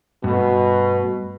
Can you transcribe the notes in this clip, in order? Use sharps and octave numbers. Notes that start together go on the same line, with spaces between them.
G2 B2 A3